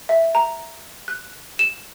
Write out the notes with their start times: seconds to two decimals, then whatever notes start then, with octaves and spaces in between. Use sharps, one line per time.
0.09 E5
0.35 A#5
1.08 F#6
1.59 E7